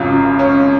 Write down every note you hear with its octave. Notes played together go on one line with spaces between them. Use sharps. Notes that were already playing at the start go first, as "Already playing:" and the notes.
Already playing: G#1 F#2 C#3 F#3 F4
C#4